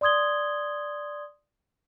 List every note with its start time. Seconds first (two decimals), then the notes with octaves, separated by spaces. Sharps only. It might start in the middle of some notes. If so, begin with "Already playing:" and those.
0.01 D5 C6 D#6 G#6 G7